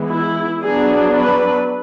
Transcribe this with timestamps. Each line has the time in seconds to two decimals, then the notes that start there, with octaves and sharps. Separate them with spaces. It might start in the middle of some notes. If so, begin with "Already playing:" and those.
Already playing: E3 G#3 B3
0.10 E4
0.64 F#3 B3 D4 G#4
1.18 B4